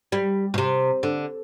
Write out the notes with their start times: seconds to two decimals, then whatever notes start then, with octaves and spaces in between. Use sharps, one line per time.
0.12 G3
0.54 B2
0.58 C3
1.03 D3